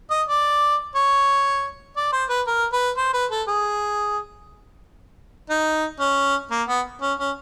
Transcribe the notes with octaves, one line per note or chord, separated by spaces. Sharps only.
D#5
D5
C#5
D5
C5
B4
A#4
B4
C5
B4
A4
G#4
D#4
C#4
A#3
B3
C#4
C#4